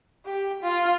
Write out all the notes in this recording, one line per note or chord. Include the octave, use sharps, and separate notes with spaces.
G4
F4